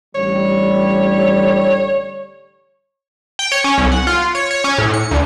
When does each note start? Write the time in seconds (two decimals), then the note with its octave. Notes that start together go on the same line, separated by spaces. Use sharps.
0.15 A1 D3 G3 C#5
3.39 G5
3.52 C#5
3.64 C#4
3.78 C2
3.92 F#5
4.07 F4
4.35 C#5
4.51 C#5
4.64 C#4
4.78 A2
4.94 C#7
5.11 D2